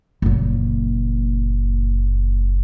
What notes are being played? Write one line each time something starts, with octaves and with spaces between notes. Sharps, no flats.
F#1 A#2